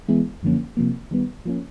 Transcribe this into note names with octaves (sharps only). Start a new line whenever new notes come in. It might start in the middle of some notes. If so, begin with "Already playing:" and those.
E3 G#3 B3 E4 G#4
F#2 D3 F3 A#3 C#4
C3 F3 A#3
D#3 G3 B3
F3 A#3 C#4